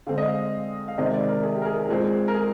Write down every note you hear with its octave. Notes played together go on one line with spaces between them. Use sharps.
D3 G#3 C4 F5
D#5
F5
F5
C3 D#3 G#3 C4 D#5
D5
A#4
G#4
G4
A#4
G#4
G#4
A#2 G#3 C4 G#4
A#4
G#4